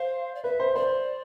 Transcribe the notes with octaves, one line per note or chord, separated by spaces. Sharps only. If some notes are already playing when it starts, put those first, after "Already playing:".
Already playing: C5 F5
D5
B4 E5
C5
C5 D5